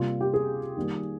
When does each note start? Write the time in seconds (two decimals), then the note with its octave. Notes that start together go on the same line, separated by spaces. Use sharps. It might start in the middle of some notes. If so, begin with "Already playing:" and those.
Already playing: C3 G3 A#3 F4
0.21 G4
0.34 G#4
0.77 D#3 G3 A#3